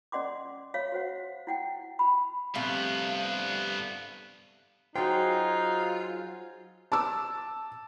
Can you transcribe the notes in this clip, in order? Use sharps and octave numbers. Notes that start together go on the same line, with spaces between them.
C#4 D5 D#5 F#5 C6 D6
C#5 E5 F5
F#4 C5 F#5
E4 F#5 G5
B5
G2 C3 F3 A3 B3
F#3 D#4 F4 F#4 G#4 C5 G5
A5 D6 E6